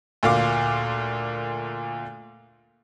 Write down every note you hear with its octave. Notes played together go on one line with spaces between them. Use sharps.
D2 A#2 F5 D6